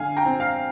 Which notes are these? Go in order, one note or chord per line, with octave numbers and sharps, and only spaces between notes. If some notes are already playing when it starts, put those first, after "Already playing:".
Already playing: D3 F5 G#5
G5 A#5
C4
F5